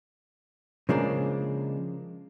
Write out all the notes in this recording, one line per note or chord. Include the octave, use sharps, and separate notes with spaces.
C#3 F3 G#3 A#3 D4